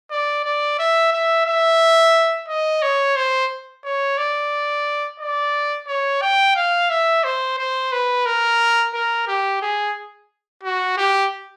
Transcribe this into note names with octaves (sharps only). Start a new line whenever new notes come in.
D5
D5
E5
E5
E5
D#5
C#5
C5
C#5
D5
D5
C#5
G5
F5
E5
C5
C5
B4
A#4
A#4
G4
G#4
F#4
G4